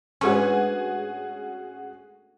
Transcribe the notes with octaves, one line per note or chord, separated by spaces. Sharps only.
G#2 A3 B3 C#4 D4 F#4 G#4 G#5